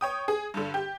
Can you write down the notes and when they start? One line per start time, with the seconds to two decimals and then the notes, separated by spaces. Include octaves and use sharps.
0.01 C#5 G5 D#6
0.28 G#4
0.54 G2 D3
0.74 G4